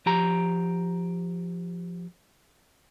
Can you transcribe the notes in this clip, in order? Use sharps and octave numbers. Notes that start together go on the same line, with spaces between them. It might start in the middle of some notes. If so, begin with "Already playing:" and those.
F3 G4 A#5